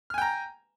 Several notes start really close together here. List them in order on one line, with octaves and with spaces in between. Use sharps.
F6 G#5 G5 A#5